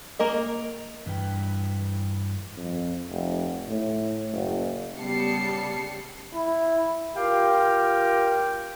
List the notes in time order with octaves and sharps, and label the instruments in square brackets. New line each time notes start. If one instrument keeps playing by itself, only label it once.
[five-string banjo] A#3 A#4 D#5
[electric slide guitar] G2 E3 B4 G5
[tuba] F2
F1
A2
F#1
[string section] C#3 G3 B3 A5 C7 C#7
[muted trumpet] E4
[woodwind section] F4 G4 A#4 F5 G5